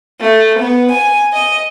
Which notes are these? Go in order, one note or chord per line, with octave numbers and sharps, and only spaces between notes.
A3
B3
G#5
D#5